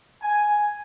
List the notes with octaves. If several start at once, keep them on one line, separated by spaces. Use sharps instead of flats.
G#5